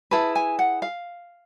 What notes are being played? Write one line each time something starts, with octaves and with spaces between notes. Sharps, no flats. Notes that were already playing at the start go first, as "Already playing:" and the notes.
E4 G#4 B4 A5
G#5
F#5
F5